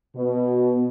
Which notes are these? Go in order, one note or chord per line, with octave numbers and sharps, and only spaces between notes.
B2